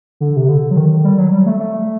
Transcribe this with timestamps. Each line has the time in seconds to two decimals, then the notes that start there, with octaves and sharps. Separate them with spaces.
0.20 D3
0.36 C3
0.48 D3
0.71 F#3
0.77 D#3
1.04 G3
1.18 F#3
1.32 G3
1.46 A3
1.60 A3